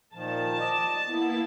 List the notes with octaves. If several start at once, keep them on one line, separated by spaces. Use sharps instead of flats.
A#2 D#3 F3 A5
D5 D#5
A#3 B3 E4